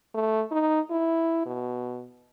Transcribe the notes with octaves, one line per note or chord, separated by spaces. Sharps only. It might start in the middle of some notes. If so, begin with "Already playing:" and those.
A3
D#4
E4
B2